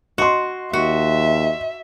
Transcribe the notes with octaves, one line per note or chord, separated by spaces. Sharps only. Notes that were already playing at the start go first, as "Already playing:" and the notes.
F#4 D#5 C6
D#2 F#4 E5